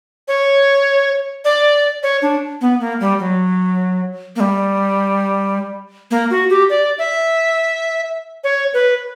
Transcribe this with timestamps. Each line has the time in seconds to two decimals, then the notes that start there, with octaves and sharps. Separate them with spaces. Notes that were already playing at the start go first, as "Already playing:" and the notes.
0.28 C#5
1.45 D5
2.03 C#5
2.22 D4
2.61 B3
2.80 A#3
3.00 G3
3.19 F#3
4.36 A#3
4.40 G3
6.11 A#3
6.30 F#4
6.50 G4
6.70 D5
6.98 E5
8.44 C#5
8.74 B4